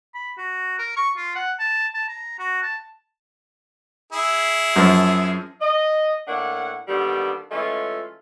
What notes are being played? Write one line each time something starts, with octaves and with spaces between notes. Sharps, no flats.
B5
F#4
A#4
C#6
F4
F#5
A5
A5
A#5
F#4
A5
E4 G#4
F#2 F3
D#5
A2 A#3 D4 F#5
D3 D#3 G3 A#3 B3 D4
E3 G#3 A3 C#4 F4